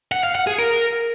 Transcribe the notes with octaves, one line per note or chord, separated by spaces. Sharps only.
F#5
F5
F#5
G#4
A#4